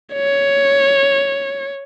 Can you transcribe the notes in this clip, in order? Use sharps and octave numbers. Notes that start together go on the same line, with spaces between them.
C#5